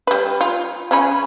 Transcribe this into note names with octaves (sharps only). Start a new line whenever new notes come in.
G3 B4
F4
C#3 C#4 B5